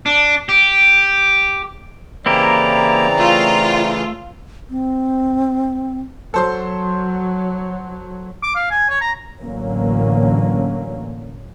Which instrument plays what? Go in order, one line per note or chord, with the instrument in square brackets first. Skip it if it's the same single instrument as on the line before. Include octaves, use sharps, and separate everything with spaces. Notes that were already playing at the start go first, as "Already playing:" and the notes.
[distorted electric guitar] D4
G4
[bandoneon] C#3 E3 [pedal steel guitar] A#3 E4 G4 [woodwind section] C4 D5 A#5
[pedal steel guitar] A3 [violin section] F4
[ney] C4
[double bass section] F#3 [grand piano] A4 C5 C6
[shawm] D6
F5
G#5
C#5
A#5
[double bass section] A1 D3 F#3 A#3 C#4